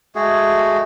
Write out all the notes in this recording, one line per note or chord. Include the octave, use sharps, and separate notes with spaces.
G#3 A3 F#4 G#4